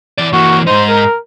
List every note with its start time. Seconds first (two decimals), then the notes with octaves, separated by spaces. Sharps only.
0.18 E3 D5
0.33 E3 A#3 F#4
0.67 G#2 D#4 C5
0.88 A#4